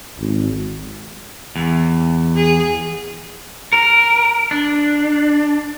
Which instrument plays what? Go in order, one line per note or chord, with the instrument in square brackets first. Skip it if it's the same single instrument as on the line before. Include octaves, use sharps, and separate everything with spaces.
[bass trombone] G#1
[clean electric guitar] E2
[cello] G#4
[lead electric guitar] A#4
D4